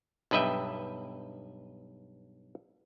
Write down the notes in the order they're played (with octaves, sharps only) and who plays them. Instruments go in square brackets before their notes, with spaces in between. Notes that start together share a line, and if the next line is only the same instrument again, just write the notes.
[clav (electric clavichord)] B1 G2 B4 D#5 E5 G5